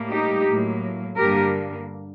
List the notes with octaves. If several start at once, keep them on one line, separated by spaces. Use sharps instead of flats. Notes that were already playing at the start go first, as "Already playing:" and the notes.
Already playing: A2 G3 A#3
D#4 G4
A2 F#3 A#3
G2 D3 G3 A#3 G4 A#4